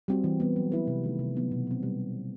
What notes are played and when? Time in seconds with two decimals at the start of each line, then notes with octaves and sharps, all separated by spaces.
0.08 G3 C4 F#4
0.24 E3
0.40 G3 B3
0.56 F#3
0.72 B3 E4 B4
0.87 C3
1.03 D#3 A3 D#4
1.19 C3
1.35 F#3 B3 D#4
1.51 B2
1.67 F#3 C4
1.83 G3